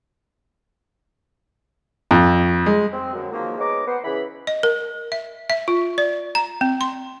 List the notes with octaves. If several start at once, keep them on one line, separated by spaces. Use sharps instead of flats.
F2
G#3
C4
F#2 D3
D#3 F3 F#3 G#3 A#3
G#3 B3 D#4 C#5 A#5 D6
B3 B4 C5 F#5
C#3 E3 B5
D#5
A#4
E5
E5
F4
D5
A#5
C4
C6